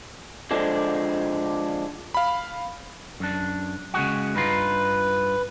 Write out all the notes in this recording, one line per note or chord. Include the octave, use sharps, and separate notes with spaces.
D3 F3 G#3 D4
F5 B5
F#2 D4
C#3 G#3 F#4
G2 D#4 F4 B4